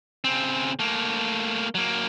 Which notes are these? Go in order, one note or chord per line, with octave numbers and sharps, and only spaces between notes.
C#3 C4
A3 A#3
F#3 A#3